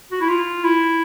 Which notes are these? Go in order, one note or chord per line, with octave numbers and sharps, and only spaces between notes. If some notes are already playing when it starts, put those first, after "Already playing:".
F#4
E4
F4
E4